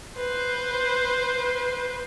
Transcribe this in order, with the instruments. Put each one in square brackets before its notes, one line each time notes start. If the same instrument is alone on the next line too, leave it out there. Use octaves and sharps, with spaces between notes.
[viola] B4 C5